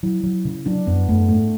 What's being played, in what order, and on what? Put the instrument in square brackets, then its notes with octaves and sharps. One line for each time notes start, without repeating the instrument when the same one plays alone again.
[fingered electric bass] F#3 [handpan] E4
[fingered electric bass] F#3
C#3
[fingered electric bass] F#3 [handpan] D4
[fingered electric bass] F#2 [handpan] B3
[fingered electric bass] F#2 [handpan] A3
[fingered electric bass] G#2 [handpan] A3